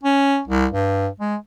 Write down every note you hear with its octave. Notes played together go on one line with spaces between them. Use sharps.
C#4
C2
G2
G#3